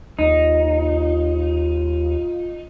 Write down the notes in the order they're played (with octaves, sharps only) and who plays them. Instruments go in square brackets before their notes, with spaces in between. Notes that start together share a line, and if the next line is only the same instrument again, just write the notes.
[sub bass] D#2 [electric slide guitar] D#4 [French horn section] F4